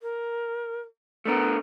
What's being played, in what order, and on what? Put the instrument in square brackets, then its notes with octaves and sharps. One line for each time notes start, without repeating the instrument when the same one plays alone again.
[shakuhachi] A#4
[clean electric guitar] A3 D4 A#4 [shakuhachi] B3